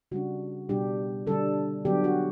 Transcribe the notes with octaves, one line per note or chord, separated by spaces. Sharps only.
C#3 G3 D4 F#4
B2 G3 D4 G4
D3 G3 D4 A4
D3 F#3 B3 D4 G4
F#4